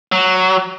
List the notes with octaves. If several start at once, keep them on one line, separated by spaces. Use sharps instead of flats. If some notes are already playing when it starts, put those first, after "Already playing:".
F#3